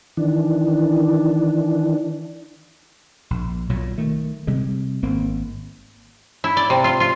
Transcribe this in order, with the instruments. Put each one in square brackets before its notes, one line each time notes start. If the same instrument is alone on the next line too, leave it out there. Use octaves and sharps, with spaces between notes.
[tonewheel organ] D#3 E3 D4
[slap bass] A#1
B1 A#2 F#3
D#3 A3
C3 G3 G#3
G#1 A#3 C4
[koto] E4
D5
C3
F4
F4